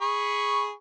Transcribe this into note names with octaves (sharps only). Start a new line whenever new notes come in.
G#4 B5 C#6